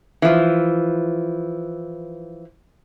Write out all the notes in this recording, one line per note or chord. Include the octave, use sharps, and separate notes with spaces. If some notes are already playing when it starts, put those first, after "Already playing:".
E3 F3